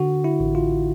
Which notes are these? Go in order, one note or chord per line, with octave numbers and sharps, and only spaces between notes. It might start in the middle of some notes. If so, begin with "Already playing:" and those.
Already playing: D3 F#4
E4
A1
F4